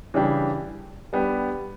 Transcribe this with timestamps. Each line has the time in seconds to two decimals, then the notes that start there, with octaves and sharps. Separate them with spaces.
0.14 C#3 E3 G3 D4 G4
1.13 G3 B3 D4 G4